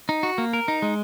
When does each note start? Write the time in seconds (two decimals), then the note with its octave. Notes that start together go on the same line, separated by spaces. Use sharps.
0.09 D#4
0.23 F#4
0.38 A#3
0.53 A#4
0.68 D#4
0.82 G#3